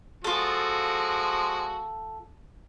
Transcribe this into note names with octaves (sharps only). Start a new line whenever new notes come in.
F3 G#3 F4 F#4 A4